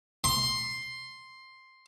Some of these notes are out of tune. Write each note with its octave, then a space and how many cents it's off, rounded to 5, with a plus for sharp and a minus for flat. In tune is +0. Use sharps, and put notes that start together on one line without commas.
C6 +5